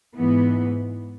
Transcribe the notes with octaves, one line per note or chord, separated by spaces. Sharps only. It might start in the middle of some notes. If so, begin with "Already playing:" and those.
G#2 E3 B3